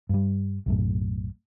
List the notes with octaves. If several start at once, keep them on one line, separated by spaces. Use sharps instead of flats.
G2 G3
B1 F#2 A2